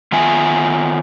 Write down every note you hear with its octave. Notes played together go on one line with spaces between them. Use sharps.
D#3 B3 F4 E5 G#5